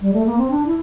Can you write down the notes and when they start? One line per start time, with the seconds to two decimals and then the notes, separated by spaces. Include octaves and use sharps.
0.01 G3
0.14 A3
0.26 A#3
0.38 C4
0.51 D4
0.66 E4